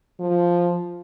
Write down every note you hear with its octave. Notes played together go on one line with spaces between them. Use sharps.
F3